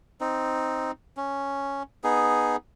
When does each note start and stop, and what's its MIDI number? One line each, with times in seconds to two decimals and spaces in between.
0.21 0.91 60
0.21 0.91 63
1.17 1.83 61
2.04 2.56 59
2.04 2.56 63
2.04 2.56 68